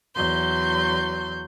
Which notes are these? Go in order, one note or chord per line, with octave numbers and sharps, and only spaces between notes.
E2 F#3 C6 G6